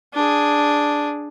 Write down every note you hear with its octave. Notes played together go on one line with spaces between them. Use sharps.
D4 G#4